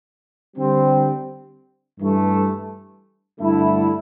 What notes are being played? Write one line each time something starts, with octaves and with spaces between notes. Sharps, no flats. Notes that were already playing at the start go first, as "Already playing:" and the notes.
D3 G3 C4
G2 E3 A3
G2 D3 A3 E4